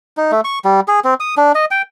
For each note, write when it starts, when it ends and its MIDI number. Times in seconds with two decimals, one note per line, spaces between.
0.17 0.31 63
0.32 0.41 57
0.44 0.59 85
0.65 0.80 55
0.88 1.00 68
1.04 1.14 60
1.20 1.35 87
1.37 1.52 62
1.55 1.65 75
1.71 1.82 79